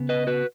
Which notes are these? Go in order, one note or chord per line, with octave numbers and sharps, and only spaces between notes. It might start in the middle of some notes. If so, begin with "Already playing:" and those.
Already playing: C#3 B3
B4 D#5
F#4 B4